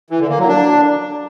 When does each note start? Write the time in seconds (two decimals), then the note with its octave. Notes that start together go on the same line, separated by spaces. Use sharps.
0.10 E3
0.20 D3
0.29 A#3
0.39 F#3
0.48 D4